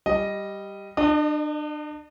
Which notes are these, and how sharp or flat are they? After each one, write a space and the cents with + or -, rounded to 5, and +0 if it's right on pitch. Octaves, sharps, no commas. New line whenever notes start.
G3 +0 D#5 +0
D4 +35 D#5 -30